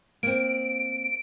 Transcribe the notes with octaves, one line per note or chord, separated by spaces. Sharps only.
A#3 C4 D7